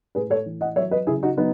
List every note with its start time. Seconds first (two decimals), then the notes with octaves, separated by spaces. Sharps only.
0.15 A2 G#4 B4
0.30 A4 C#5
0.46 E3
0.61 D#5 F#5
0.76 F#3 C#5 E5
0.91 B4 D#5
1.07 C#3 E4 G#4
1.23 D#4 F#4
1.37 F#3 B3 D#4